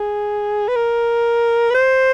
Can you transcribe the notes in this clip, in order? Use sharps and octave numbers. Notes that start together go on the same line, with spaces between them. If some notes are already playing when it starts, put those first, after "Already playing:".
Already playing: G#4
B4
A#4
B4
C5